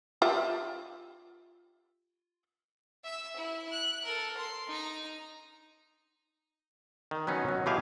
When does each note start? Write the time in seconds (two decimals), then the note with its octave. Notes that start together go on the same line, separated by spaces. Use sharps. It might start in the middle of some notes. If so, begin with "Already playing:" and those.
0.22 F4 G4 E5
3.04 E5 E6
3.36 E4
3.71 F#6
4.04 A4 A#4
4.37 C6
4.67 D#4 A#5
7.11 D#3
7.27 F#3 B3 C#4 D#4
7.49 F#3
7.66 B2 E3 G4 G#4 F5 G#5